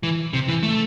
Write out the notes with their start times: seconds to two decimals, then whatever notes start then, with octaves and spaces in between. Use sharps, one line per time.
0.03 E3
0.33 C3
0.49 E3
0.63 A3